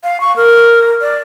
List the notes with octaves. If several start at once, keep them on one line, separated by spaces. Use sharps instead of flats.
F5
C#6
A#4
D5